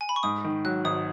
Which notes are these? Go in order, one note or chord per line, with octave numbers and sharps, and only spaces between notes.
G#5
B5
C#6
G#2 D#6
D#3
F#3 F#6
G#1 D#6